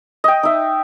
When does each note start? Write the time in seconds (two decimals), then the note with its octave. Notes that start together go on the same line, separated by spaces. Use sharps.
0.24 D#5 G5
0.43 D#4 E5